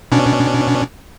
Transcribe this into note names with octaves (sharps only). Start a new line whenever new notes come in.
B2 C#4 D4